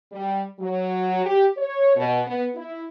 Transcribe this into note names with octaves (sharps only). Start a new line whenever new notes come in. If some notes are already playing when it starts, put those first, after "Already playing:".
G3
F#3
G4
C#5
B2
B3
E4